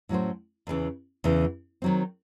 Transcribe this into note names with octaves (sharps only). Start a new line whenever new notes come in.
A2 F#3 C#4 F#4 C5
E2 C#3 E3
E2 C#3 E3
D#3 F#3 C4